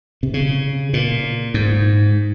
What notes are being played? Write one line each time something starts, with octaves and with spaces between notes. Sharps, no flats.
C3
C#3
A#2
G#2